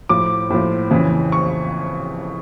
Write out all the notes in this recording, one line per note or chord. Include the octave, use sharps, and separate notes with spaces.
A2 F3 D6
A2 F3
F2 C#3 E3
C#6